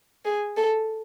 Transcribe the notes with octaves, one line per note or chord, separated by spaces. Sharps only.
G#4
A4